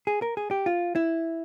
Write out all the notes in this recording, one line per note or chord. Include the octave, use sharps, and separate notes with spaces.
G#4
A#4
G#4
G4
F4
E4